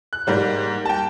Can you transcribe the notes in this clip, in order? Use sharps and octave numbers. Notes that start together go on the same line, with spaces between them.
F#6
G#2 G3 A#3
G5 A5